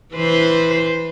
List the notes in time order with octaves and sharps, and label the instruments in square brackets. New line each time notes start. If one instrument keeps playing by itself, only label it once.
[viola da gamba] E3 B4 C5